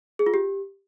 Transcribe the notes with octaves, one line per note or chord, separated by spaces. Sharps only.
G#4
F4
G4